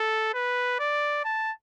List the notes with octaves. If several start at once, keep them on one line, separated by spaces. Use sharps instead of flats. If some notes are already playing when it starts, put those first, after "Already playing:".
Already playing: A4
B4
D5
A5